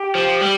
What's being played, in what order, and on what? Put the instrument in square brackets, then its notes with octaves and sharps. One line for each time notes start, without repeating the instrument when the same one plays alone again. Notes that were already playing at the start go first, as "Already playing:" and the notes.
Already playing: [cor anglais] G4
[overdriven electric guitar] F3
G3